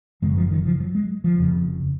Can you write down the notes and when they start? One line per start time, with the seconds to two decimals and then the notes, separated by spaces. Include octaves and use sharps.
0.22 F#1 F#2 C#3 G#3
0.31 F#3
0.37 F3
0.51 D#3
0.66 F3
0.80 F#3
0.95 G#3
1.24 F3
1.38 F1 F2 C#3